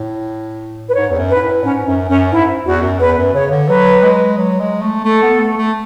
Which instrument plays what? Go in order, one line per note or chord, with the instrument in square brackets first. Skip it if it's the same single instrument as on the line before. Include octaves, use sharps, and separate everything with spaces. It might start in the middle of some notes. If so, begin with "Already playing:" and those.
Already playing: [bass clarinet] A2
[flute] B4
[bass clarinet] G#2 [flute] C#5
[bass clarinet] E2
F#2
[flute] B4
[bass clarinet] G#2
A2
[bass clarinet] G#2 [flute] C#4
[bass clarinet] F#2 [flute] C#4
[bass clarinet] F#2 [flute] C#4
[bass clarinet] G#2 [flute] E4
[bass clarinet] E2 [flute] F#4
[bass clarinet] F#2
[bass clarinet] E2 [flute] B4
[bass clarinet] F#2
[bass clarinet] C#3 [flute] C#5
[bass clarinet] D3
[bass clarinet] F#3 [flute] B4
[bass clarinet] G#3
F#3
G#3
A3
[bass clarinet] A3 [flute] A4
[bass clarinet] B3
A3
A3